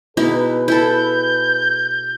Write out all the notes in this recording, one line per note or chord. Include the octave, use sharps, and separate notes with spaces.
B2 D#4 E4 G#4 B4
E4 A4 G6